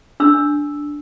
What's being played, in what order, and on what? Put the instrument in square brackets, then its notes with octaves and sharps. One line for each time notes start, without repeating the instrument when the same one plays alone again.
[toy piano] D4 E6